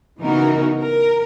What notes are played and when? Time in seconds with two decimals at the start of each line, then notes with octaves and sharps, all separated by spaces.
0.19 C#3 E3 B3 D#4 F#4 A#4
0.80 A#4